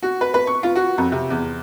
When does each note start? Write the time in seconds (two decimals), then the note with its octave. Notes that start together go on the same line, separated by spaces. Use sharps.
0.03 F#4
0.21 B4
0.34 B4
0.47 C#6
0.63 F4
0.76 F#4
0.98 F2
1.12 C3
1.30 E2